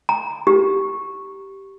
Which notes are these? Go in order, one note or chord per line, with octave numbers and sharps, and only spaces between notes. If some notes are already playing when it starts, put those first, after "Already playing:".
A#5
G4